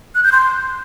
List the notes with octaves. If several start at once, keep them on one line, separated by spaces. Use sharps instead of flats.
F#6
G6
C6